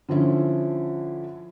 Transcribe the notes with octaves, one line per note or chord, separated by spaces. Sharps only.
D3 F3 C#4 E4